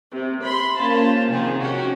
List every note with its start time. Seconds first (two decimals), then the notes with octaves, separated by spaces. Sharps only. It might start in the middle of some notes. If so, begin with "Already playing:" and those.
0.12 C3
0.44 B5 C6
0.79 A#3 C#4 F4 C5 A5
1.29 C3 D#3 F3 F4 G#4
1.59 C#4 F#4 G4